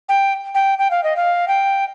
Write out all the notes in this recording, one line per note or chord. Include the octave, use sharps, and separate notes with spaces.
G5
G5
G5
F5
D#5
F5
G5